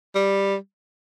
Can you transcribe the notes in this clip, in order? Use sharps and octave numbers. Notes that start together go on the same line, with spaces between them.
G3